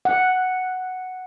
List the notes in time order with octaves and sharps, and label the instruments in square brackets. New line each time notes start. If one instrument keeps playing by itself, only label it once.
[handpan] F#5